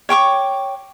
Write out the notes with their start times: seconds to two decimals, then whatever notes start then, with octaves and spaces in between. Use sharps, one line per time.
0.09 C#5 G5 C#6 D6